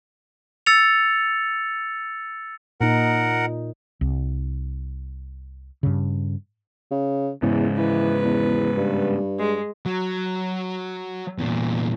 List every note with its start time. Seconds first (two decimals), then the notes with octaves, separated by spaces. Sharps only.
0.66 E6 A6 C#7 F7
2.81 A#2 D#4 A#4 F#5
4.01 C2
5.83 G2 C#3
6.91 C#3
7.42 E2 G#2 C#3
7.77 E3 B4
8.24 E2
8.78 G2
9.39 G#3
9.86 F#3
11.38 E2 A#2